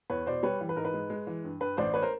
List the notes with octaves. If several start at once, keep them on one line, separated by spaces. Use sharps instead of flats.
E2 B4 C#5
B2 C5 D5
G3 B4 C#5
E3
B4
G#2 A#4
B4
G#3
G#3
E3
G2
G2 B4
A1 C5 D5
B4 C#5
A#4 C5